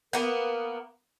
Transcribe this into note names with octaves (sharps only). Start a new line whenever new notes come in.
A#3 B3 A#4